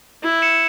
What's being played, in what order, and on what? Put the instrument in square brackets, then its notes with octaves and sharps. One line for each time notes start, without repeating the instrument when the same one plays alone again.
[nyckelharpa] E4
[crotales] C#7 E7